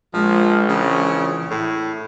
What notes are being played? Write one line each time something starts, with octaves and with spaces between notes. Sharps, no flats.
A#1 F3 G#3
C#3 E3
A2 E4